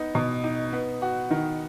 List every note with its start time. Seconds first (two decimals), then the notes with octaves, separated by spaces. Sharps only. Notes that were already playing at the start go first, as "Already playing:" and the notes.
Already playing: B3 D#4
0.15 B2
0.44 D#4
0.73 B3
1.02 F#4
1.31 D#3